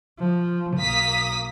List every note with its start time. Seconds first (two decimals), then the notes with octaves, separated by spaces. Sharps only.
0.19 F3
0.78 B1 A#3 D#6 B6